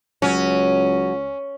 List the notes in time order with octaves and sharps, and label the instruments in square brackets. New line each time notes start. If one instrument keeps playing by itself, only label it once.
[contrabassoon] C#2 [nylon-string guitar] F#3 [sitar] C#4